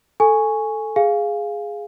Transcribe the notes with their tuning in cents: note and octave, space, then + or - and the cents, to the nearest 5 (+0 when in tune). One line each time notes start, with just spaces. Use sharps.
A4 +0 G#5 +0 C#6 +0
G#4 +0 F5 +0 G#5 +0